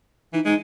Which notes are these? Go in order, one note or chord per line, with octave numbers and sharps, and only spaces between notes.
E3 D#4
G#3 D#4